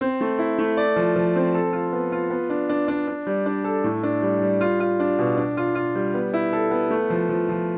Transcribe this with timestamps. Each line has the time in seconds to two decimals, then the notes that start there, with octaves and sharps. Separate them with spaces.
0.01 C4
0.21 A3
0.39 E4
0.58 A3
0.77 D5
0.96 F3
1.16 F3
1.36 C4
1.55 A4
1.73 F4
1.93 B3
2.12 F4
2.30 B3
2.50 D4
2.69 D4
2.88 D4
3.08 D4
3.27 G3
3.46 D4
3.64 A4
3.84 A2
4.03 D4
4.22 G3
4.42 G3
4.61 F4
4.80 F4
5.00 D4
5.19 B2
5.37 D4
5.57 F4
5.75 F4
5.95 G3
6.14 B3
6.33 E4
6.53 A4
6.71 B3
6.91 A3
7.10 F3
7.29 F3
7.49 F3